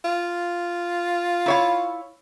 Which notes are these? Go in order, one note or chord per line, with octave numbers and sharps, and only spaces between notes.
F4
E4 C#5 F5